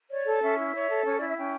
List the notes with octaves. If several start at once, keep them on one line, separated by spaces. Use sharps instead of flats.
C#5 D5
A4
C#4 E5
E4
C#5
A4
C#4 C#5
E4 D5
E5
C#4 G5